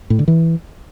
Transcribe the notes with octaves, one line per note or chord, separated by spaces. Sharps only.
A2
D3
E3